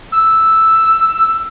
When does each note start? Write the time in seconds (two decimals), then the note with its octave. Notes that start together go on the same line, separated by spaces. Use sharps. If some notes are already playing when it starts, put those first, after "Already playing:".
0.12 E6